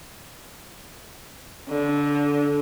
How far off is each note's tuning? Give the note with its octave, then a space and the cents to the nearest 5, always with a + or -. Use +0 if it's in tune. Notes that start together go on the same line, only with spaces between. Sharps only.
D3 -20